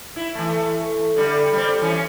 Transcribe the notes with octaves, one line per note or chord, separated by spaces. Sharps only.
E4
E3 A3
D3 G3
G3 C4
E3 C#4